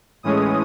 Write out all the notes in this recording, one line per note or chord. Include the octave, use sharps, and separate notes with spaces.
A2 E3 G#3 C#4 D#6